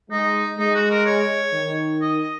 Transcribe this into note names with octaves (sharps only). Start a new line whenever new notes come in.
G#3 D#4
G#3 D#4
F#4
A#4
C#5
D#3
D#5